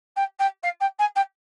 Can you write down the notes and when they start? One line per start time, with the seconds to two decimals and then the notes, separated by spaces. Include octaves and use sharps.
0.16 G5
0.39 G5
0.63 F5
0.80 G5
0.99 G#5
1.15 G5